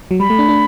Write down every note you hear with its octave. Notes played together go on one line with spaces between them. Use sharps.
F#3
G3 B5
A3
D4
D4